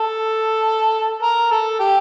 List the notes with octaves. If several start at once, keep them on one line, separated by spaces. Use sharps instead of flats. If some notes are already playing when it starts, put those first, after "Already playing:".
Already playing: A4
A#4
A4
G4